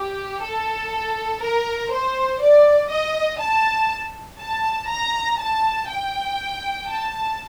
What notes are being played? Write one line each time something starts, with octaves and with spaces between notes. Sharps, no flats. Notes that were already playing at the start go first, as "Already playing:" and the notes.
Already playing: G4
A4
A#4
C5
D5
D#5
A5
A5
A#5
A5
G5
A5